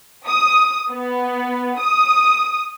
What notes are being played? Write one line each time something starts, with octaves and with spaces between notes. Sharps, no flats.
D#6
B3
D#6